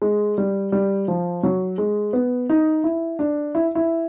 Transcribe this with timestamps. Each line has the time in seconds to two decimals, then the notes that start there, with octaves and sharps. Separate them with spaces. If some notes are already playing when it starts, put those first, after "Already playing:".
0.02 G#3
0.38 G3
0.72 G3
1.08 F3
1.43 F#3
1.78 G#3
2.13 B3
2.49 D#4
2.84 E4
3.19 D4
3.55 E4
3.75 E4